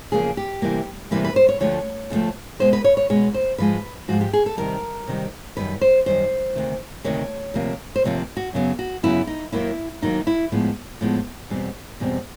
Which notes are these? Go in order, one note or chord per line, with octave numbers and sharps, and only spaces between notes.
E2 C#3 F3 A#3 G#4
G4
C3 E3 G3 A#3
C3 E3 G3 A#3 B4
B4
C5
C#5
D2 D3 F3 A3 C#5
D2 D3 F3 A3
B2 G#3 B3 C5
B4
C#5
C#5
B2 G#3 B3 C#5
C5
G#2 F3 G#3 B4
G#2 F3 G#3 F#4
G4
G#4
A4
C3 D#3 G3 A#4
C3 D#3 G3
F#2 D#3 G3 B4
C5
F#2 D#3 G3 C5
D2 C3 D#3
D2 C3 D#3 C#5
D2 C3 F3 A#3
C5
D2 C3 F3 A#3 C#5
F#4
F#2 C#3 F#3 B3
F#4
F#2 C#3 F#3 B3 E4
D#4
D#2 D#3 F#3 A#3 E4
D#2 D#3 F#3 A#3 D#4
E4
A2 F3 G#3 B3
A2 F3 G#3 B3
E2 B2 G3 C4
E2 B2 G3 C4